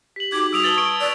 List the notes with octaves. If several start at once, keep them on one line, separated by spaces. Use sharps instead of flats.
G4 B6 F#7
D#4 F#4 G#4 D6 G#6
G3 F#4 D#6 E6 D7 F7
B4 A5 A6 F#7 G7
C#6 D7 G7
D5 E6